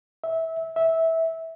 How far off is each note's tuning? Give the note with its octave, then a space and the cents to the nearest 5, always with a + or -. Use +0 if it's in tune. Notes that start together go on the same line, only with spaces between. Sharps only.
E5 -20
E5 -15